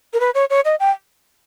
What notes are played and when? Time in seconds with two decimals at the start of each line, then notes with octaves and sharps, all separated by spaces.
0.13 A#4
0.20 B4
0.35 C#5
0.50 C#5
0.65 D#5
0.80 G5